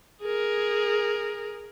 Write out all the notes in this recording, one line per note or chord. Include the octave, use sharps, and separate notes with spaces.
G#4 A#4